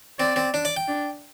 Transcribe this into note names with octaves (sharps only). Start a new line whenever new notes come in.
C4 D5
C4
D4
D5
G5
D4